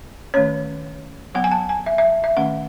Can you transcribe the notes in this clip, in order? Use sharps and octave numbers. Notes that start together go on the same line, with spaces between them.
D#3 A3 C#4 C#5
F#3 B3 F#5
G#5
A5
G#5
E5
E5
E5
D#3 A3 C#4 F#5